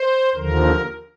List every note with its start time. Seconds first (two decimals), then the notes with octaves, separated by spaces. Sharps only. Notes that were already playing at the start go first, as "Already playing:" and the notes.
Already playing: C5
0.35 D#2 D3 F3 A#4